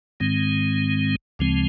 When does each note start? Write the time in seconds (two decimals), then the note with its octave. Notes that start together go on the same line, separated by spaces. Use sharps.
0.20 G#2 D#3 G#3 C4
1.39 D2 C#3 F3 G#3 C4